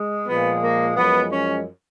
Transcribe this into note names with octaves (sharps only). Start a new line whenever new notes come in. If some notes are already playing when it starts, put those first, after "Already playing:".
Already playing: G#3
A#2 F3 G#3 B3
A#3
F#2 F3 G#3 B3
C#4